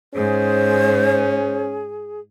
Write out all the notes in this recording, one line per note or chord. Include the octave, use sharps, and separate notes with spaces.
G#2 C#4 G#4 C5